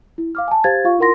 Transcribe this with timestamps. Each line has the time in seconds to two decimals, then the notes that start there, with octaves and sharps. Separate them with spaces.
0.18 E4
0.35 F5 D6 F6
0.48 G#5 A5
0.64 G4 C5 F5 G#6 A6
0.85 F4 F5 C#6
0.99 E4 F4 A#4 F#5 C6 A#6